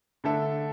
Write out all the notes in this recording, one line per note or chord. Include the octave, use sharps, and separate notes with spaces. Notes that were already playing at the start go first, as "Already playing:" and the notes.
D3 A3 D4 A4 E5